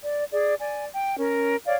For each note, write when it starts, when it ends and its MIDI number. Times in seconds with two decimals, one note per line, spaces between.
0.03 0.25 74
0.32 0.54 68
0.32 0.54 74
0.60 0.86 74
0.60 0.86 80
0.94 1.18 79
1.18 1.55 61
1.18 1.55 70
1.65 1.75 73
1.65 1.75 74
1.65 1.75 77